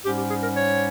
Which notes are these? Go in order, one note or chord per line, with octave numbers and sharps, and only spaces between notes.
G#2 G3 C#4 G4
G4
G#4
A#4
C#5